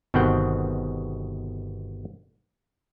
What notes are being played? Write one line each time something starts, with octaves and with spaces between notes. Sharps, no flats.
G1 B2 D#3 C4 F#5 G5